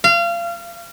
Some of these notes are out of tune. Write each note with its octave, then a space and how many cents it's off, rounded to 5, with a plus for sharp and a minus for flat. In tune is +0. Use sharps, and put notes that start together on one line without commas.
F5 -30